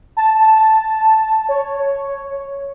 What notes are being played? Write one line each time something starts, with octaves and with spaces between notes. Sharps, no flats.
A5
C#5